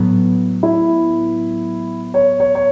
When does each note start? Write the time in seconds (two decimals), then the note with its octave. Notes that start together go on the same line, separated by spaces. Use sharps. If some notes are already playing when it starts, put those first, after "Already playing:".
Already playing: A2 F#3 B3
0.63 E4
2.14 C#5
2.40 C#5
2.55 C#5